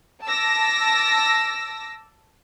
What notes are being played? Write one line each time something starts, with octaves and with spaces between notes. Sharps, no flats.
A5 D6 E6 A#6